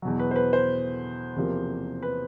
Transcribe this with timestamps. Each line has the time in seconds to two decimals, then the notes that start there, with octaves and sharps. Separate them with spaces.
0.02 E2 B2 F#3
0.19 B4
0.31 C5
0.36 B4
0.53 C5
1.36 E2 C3 F3 A#3
2.02 B4